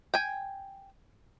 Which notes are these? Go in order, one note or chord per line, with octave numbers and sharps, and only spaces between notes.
G5 G#5